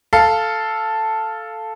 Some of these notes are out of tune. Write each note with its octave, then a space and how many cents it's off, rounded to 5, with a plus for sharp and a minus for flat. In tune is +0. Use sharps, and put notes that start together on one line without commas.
A4 +0 F5 -5